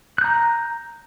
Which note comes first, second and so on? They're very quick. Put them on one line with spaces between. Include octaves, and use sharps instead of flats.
F#6 G6 A#5